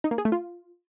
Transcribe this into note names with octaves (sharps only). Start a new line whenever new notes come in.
D#4
A#3
G#4
A3
F4